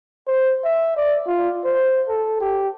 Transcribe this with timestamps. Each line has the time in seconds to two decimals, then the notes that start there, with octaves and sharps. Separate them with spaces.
0.28 C5
0.64 E5
0.97 D5
1.27 F4
1.65 C5
2.08 A4
2.40 G4